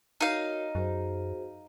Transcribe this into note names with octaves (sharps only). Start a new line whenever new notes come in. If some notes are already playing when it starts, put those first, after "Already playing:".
D#4 F#4 A#4 C#5 F5
F#2 F#4 G#4 C5